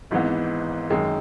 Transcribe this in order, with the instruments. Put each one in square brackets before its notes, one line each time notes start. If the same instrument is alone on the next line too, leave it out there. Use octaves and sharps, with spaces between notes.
[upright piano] G#1 G#2 E3 B3
F#2 D#3 G#3